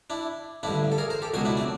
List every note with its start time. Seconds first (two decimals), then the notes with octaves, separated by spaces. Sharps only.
0.10 D4 E4
0.63 A1 G2 D3 D4 E4
0.92 A4
0.98 G#4 A#4
1.10 A#4 C5
1.22 G4 A4
1.34 C#2 B2 F#3 F#4 G#4
1.45 D4 E4
1.57 C4 D4